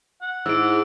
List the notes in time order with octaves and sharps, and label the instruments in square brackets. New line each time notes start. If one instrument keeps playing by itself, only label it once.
[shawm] F#5
[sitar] G#2 [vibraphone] E4 G#4 C5 [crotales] E6 D7